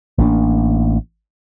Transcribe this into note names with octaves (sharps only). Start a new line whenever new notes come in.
A1 A#3 D4